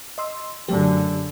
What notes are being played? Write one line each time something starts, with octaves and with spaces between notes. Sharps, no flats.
D#5 C6 E6
F#2 D3 F#3 A3 G4